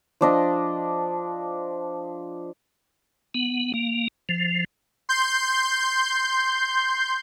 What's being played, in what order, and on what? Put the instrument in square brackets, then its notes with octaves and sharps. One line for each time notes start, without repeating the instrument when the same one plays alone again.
[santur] F3 D4 D#5
[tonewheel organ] B3
A#3
F3
[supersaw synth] C6 G6